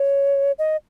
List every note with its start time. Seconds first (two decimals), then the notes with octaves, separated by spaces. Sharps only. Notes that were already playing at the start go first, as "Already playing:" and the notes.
Already playing: C#5
0.59 D#5